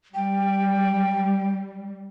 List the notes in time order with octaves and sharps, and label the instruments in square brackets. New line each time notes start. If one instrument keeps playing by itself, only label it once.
[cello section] G3 [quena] G5